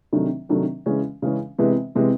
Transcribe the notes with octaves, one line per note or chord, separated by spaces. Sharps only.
C3 D#3 F#3 A3 D4
C3 D#3 F#3 A3 D4
C#3 E3 G#3 C#4
C#3 E3 G#3 C#4
C3 E3 G#3 B3
C3 E3 G#3 B3